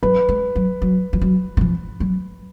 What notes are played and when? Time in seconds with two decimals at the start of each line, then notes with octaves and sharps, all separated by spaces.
0.03 F#3 B4
0.29 G#3
0.56 F#3
0.82 F#3
1.13 F3
1.21 F#3
1.57 D#3
1.61 F3
2.00 F#3